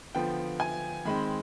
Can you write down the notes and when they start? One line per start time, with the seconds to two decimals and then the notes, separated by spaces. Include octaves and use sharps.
0.15 D3 F3 B3 G5
0.60 G#5
1.05 D#3 G#3 C4 B5